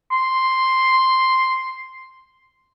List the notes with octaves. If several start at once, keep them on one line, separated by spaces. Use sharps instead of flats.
C6